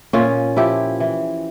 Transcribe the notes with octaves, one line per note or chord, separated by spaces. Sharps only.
A#2 C#4 F4
F3 E4 G4
E3